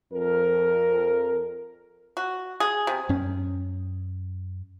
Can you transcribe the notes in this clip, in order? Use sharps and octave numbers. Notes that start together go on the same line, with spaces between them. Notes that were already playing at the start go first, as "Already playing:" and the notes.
F2 A#4
F#4
G#4
C3
F#2 C#4